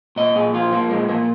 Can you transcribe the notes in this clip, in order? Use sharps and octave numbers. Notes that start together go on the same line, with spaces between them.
A#2 D#5
A#2 G#4
F3 F4
F3 A#3
A#2 G#3
A#2 A#3